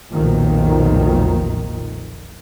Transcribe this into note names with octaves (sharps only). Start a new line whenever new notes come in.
F1 B1 A#2 D#3 F3